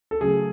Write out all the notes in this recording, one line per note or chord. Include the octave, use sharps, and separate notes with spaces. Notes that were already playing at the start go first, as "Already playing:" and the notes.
A4
C#3 F#3 A3 G#4